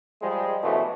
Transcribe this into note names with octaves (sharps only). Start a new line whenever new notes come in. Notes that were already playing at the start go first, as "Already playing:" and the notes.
F3 G3 G#3
F#2 B2 E3 F3 A3